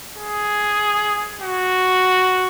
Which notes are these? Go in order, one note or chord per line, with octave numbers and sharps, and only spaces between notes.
G#4
F#4